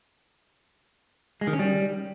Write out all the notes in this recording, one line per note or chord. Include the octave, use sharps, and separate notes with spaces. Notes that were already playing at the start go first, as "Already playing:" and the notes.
G#3
D#3
C#4
G3